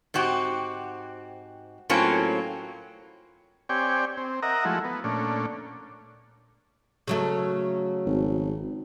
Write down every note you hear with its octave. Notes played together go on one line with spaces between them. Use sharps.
G#2 C4 F#4 G4
A2 F#3 A#3 C4 C#4 F4
C4 G4 C#5 D5 G5 G#5
C4
A#4 D#5 E5 F#5 A#5
F3 G#3 A3 E4 F#4
B3
A#2 A3 C#4 D4
C#3 F#3 A3
G#1